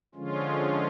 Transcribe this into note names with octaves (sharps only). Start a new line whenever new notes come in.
D3 F3 G#3 C#4 F4